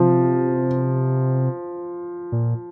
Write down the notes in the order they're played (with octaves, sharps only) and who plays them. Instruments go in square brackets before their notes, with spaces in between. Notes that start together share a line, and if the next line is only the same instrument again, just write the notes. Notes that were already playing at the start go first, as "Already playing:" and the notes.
Already playing: [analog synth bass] C3 [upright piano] F3
[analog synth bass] A#2